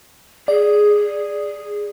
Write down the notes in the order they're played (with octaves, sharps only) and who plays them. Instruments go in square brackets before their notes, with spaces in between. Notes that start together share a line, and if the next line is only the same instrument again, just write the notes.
[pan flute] G#4 [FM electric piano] D5